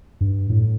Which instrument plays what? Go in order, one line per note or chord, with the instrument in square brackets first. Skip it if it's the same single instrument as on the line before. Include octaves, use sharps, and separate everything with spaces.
[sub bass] G2
A2